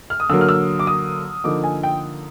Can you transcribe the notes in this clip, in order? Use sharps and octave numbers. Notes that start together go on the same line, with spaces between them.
F6
D#6
D3 F#3 A#3 E6
F6
E6
D6
D#6
D3 F3 A#3 D#4 D6
G#5
G5